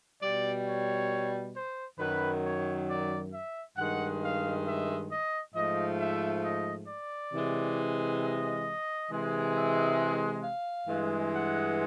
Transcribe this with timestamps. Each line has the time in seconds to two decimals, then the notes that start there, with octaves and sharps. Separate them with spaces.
0.22 B2 G3 D5
0.66 C#5
1.55 C5
1.99 F#2 D#3 F#3 B4
2.43 C#5
2.88 D5
3.33 E5
3.77 G2 D#3 G#3 F#5
4.22 F5
4.65 E5
5.10 D#5
5.55 G#2 F3 A3 D#5
5.98 E5
6.43 D#5
6.88 D5
7.32 C3 E3 G#3
8.21 D#5
9.09 C3 E3 G#3
9.55 E5
10.43 F5
10.88 G2 E3 G#3
11.32 F#5